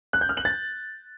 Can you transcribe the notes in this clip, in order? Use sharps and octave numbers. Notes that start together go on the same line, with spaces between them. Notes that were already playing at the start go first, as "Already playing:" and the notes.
F#6
G6
F6
F#7
A6